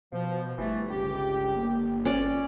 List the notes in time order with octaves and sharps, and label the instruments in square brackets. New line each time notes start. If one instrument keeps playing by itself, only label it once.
[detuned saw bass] B2 [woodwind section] F3
[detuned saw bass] G1 [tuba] G2 [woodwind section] E3 A3
[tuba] C#2 [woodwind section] G4
[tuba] A#3
[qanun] C#4 D5